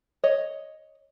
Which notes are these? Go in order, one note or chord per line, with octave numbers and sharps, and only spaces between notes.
C#5 D#5